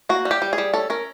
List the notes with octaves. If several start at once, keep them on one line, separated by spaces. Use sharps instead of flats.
A#3 F#4
G3
G4
G3
G#4
G3
C#4 A4
C#4 A#4